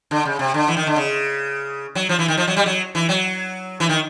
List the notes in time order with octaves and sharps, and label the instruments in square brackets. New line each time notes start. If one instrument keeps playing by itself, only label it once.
[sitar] D3
C#3
C3
D3
E3
D#3
D3
C#3
F#3
F3
E3
D#3
F3
F#3
G3
F#3
E3
F#3
E3
D#3